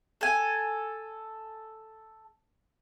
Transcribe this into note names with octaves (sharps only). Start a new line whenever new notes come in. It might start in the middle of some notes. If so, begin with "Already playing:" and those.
A4 G#5